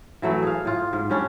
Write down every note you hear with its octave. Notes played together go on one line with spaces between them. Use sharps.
E3 F#3 A3
G#4 F5
A2 F4
G#2
G3 C#4 D4